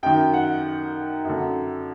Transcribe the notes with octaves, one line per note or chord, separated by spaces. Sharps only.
F#2 D#3 G5
F#5
F#2 D3